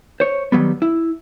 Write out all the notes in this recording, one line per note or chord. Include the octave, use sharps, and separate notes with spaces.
C5 C#5
D#3 F#3 G3 B3
E4